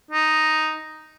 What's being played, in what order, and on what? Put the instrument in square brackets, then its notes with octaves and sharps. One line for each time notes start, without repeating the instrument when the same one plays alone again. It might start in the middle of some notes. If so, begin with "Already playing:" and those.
[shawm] D#4